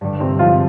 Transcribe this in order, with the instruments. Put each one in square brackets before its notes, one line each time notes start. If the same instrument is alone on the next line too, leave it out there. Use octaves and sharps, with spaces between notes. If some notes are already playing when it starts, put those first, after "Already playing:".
[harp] G2 D3 G3
[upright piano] C3 C4
F3 F4